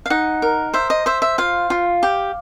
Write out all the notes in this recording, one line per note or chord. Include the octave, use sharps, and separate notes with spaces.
F5
D#4 F#5
A#4
C5 E5
D#5
C5 E5
E5
F4 F5
F4
G4